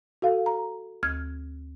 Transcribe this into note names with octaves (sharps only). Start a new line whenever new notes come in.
F#4 A4 F5
A#5
D2 F6 G#6